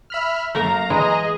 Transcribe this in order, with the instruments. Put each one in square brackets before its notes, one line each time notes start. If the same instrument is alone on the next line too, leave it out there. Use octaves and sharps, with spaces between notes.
[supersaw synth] E5 B5 F6
[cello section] F#2 F5 [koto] A3 A#3 A#4 [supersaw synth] A#5
[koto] E3 G#3 [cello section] G#4 D#5